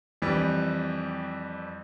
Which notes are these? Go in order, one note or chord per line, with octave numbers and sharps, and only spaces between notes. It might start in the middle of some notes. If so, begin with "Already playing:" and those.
F2 E3 G3